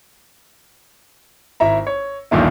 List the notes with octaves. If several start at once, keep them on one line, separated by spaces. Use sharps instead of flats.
G#1 E4 E5 A#5
C#5
D#1 B1 A#2 D3 D#3 E4